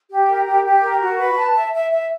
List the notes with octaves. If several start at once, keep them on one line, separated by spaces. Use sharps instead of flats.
G4
A#4
G4
G4
A#4
F#4
B4
A5
E5
E5
E5